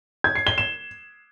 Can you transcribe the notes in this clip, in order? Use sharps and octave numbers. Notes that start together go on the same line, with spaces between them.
G#6
C7
G7
E7